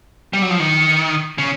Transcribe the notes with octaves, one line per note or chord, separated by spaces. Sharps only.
G3
F#3
F3
D#3
C#3